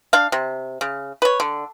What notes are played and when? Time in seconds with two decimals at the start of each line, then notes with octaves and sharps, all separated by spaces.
0.13 D4 F5
0.32 C3
0.81 C#3
1.22 B4 C#5
1.40 D3